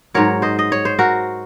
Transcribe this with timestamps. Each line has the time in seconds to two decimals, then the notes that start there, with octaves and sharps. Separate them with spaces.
0.14 G#2 F#3 A#4 C#5
0.42 C5 D#5
0.59 D#5
0.72 C#5
0.85 C5
0.99 F#4 A#4